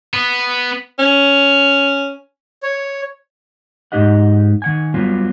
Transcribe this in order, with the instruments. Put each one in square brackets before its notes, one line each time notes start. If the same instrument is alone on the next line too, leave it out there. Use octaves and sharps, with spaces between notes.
[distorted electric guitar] B3
[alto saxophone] C#4
[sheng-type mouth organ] C#5
[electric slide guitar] G#2 F3 D#4 G4 D#5 F#5
D#3 F#5 G#5
F#3 G3 B3 F4